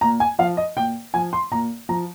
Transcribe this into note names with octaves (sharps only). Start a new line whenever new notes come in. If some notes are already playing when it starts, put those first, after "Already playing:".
A#2 A#5
G#5
F3 F5
D#5
A#2 G5
F3 G#5
C6
A#2 A#5
F3 A#5